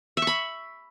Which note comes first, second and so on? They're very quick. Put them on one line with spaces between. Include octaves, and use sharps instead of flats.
E5 C#6 B5